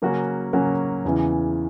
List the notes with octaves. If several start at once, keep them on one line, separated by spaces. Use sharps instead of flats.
C#3 F#3 A#3 C#4 F#4
C#3 F#3 A#3 C#4 F#4
E2 C#3 E3